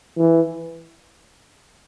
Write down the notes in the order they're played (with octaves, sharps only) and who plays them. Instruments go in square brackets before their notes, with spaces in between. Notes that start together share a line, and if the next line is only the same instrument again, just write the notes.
[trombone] E3